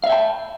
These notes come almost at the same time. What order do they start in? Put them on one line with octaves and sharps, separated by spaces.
F5 E5 G5 A5